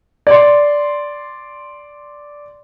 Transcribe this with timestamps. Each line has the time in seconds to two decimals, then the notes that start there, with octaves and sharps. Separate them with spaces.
0.27 D5 C6